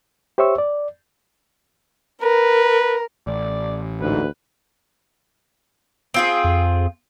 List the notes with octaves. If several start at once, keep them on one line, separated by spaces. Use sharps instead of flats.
G4 C5 C#5 E5 C#6 E6
D5
A#4 B4
A1 D5
D2 G#2 B4
C4 F4 G#4
F2